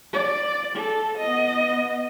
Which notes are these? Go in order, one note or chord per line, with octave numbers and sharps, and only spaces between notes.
D5
A4
B3 D#5